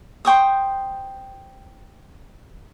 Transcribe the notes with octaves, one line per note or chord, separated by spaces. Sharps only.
C5 G5 C#6 D#6